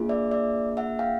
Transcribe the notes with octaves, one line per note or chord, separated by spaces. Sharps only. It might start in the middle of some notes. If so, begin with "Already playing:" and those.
Already playing: A#3 D4 F4 G#4
D5 E5
D5 E5
E5 F#5
F5 G5